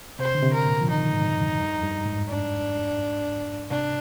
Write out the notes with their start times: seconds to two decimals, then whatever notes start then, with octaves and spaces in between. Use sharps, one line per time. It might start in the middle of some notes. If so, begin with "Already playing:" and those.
0.19 C3 C5
0.35 D3
0.43 C3
0.53 A#4
0.66 A#2
0.81 F3
0.90 D#3 D#4
1.12 G#2
1.36 F2
1.60 G2
1.78 F2
1.83 G2
2.06 G#2
2.29 D4
3.70 C3 D4